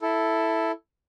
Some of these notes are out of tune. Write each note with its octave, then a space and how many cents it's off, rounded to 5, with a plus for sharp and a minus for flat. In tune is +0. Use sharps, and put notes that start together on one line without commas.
E4 +0 A4 +0